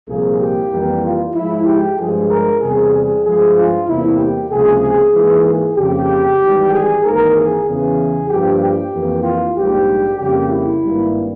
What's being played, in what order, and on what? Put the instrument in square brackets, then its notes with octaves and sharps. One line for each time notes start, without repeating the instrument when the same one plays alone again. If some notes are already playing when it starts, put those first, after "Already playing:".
[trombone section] C2 A#2 F3 A#3 G#4
G4
F2 E3 G3 A#3
F4
G#2 F3 G#3 E4
G4
G2 F3 G#3 G#4
A#4
E2 C3 G3 G#4
G#4
G2 F3 G#3 G#4
F4
E2 C3 G3 A#3 E4
G4
C#2 C3 F3 A#3 G#4
G#2 E3 A#3
G#4
F2 C#3 F3 A#3 G4
G#1 G#2 E3 G3
G#4
G#1 G#2 E3 A#3 A#4
G#4
E2 C#3 E3 G#4
G2 F3 A#3 G4
G4
F2 E3 A#3
F4
A#1 G#2 G3 A#3 G4
F2 C#3 G3 A#3 G4
E4
G#1 G2 G3 A#3